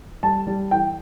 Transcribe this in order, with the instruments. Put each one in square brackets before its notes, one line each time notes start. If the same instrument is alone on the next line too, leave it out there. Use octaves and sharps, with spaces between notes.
[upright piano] G3 A5
G3
E3 G5